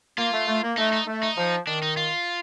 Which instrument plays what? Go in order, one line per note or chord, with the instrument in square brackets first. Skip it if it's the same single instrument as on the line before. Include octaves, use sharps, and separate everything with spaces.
[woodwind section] A#3 [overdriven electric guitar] F4
[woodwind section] A3
A3
A#3
[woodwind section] A3 [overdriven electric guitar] D#4
[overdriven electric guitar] D#4
[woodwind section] A3
[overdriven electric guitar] D#4
[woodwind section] F3
[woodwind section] D#3 [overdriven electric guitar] D4
[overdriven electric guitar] D#4
F4